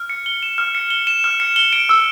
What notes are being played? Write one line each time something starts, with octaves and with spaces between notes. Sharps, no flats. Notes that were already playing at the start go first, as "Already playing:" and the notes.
Already playing: F6
C#7
G7
E7
F6
C#7
G7
E7
F6
C#7
G7
D7
E6